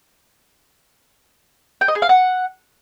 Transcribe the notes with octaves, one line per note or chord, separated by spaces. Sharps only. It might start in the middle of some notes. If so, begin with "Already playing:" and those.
G5
D#5
G#4
F5
F#5